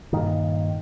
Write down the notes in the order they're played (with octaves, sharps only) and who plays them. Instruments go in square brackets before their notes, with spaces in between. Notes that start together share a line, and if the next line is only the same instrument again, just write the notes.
[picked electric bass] G2 A#2 D#3